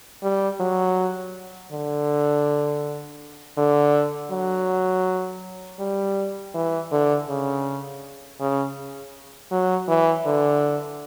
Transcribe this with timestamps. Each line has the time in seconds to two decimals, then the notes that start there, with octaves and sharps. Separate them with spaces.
0.23 G3
0.60 F#3
1.72 D3
3.58 D3
4.31 F#3
5.79 G3
6.54 E3
6.91 D3
7.29 C#3
8.40 C#3
9.51 F#3
9.88 E3
10.26 D3